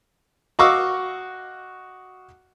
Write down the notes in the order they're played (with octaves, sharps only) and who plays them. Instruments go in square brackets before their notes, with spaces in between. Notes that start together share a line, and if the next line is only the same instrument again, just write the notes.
[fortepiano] F#4 D#5 F5 C#6 D6 E6